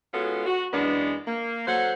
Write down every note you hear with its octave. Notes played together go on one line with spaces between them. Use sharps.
G#3 B3 C#4 F4 F#4 A4
F#4
F#2 E3 G#3 B3 D4
A#3
F#3 A4 C5 F#5